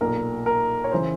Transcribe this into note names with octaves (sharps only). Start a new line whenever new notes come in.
B1 A#2 A#4
A#4
C#5
C#3 E3 C5